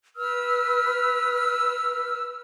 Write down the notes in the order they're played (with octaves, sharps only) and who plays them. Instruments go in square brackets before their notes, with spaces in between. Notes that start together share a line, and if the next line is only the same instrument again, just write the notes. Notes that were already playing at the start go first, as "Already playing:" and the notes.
[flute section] B4 E6 F6